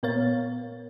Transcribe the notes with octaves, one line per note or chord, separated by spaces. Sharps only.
A#2 B3 A#4 C#5 F5 A6